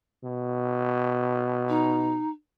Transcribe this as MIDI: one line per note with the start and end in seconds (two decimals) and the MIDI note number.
0.24 2.22 47
1.69 2.29 63